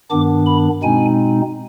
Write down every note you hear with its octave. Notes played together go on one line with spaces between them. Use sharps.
G2 D#3 B3 D4 D6
B5
B2 G#3 C4 D#4 G#5